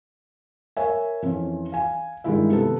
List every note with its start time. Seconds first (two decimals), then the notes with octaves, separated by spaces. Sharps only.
0.77 A#4 C#5 E5 G#5
1.22 F2 E3 C#4
1.72 F5 G#5
2.24 G2 D#3 G#3 E4 E5
2.51 C3 B3 A4